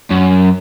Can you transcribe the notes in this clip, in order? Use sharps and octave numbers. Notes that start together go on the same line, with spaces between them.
F#2